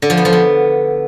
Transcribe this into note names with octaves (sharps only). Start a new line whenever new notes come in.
D3
F3
B3
F3
B3